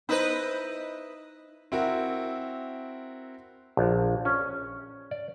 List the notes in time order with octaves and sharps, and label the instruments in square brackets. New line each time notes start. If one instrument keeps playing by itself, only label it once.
[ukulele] D#4 C5 [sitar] E4 B4 D#5
[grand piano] C4 E4 F#4 A#4
[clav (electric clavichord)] A#1
C#4
D5